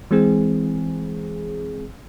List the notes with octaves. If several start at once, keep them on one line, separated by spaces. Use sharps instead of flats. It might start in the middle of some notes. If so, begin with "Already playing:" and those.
E3 G#3 C4 G#4